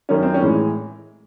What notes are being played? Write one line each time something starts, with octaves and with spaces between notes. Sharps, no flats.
F#2 D#3 F#3 C#4
C4
C#4
A2 E3 G#3